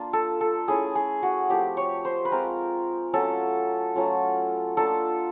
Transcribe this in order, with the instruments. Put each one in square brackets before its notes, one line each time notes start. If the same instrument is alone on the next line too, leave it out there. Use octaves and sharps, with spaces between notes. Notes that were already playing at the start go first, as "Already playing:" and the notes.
Already playing: [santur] A#3 D4 F4
A4
A4
A3 C#4 E4 G#4
G#4
F#4
F3 A3 C4 G4
C#5
C5
B4
G#3 C4 F4 A#4
F#3 A3 C#4 F4 A4
F#3 A3 C#4 F4
A#3 D4 F4 A4